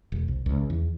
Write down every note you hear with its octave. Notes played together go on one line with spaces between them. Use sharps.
E1
C2
C#2
E2